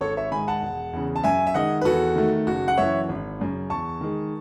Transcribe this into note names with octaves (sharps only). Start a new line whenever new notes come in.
G#1 A4 C#5
C#5 E5
G#2 D#3 G#3 G#5 B5
F#5 A5
E1
E2 C#3
A5
F#2 E5 G#5
E5
D#3 G#3 D#5 F#5
B4
E2 F#4 A4
D#3 A3
F#1 F#4
F#5
F#2 E3 C#5 E5
G#1
F#2 C#3
E2 A5 C#6
D#3 G#3